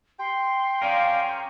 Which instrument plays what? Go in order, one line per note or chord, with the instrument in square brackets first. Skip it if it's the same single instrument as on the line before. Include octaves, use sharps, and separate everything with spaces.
[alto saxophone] G5 [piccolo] C6
[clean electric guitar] C#4 G#4 A#4 [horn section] D5 F5